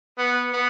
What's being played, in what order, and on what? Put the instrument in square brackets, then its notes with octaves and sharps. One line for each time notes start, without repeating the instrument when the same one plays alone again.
[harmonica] B3
B3